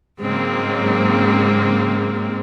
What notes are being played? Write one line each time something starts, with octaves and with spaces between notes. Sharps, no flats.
G#2 C#3 F#3 G#3 A#3 C4